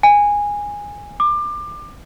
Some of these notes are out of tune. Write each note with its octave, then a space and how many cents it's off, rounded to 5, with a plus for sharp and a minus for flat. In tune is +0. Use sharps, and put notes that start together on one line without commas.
G#5 -15
D6 +25